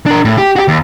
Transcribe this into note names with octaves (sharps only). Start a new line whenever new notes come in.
D4 A#4
A2
G4
F#4 G4
D#2